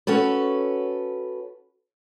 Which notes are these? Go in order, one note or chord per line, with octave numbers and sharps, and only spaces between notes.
C#4 F#4 A4 B4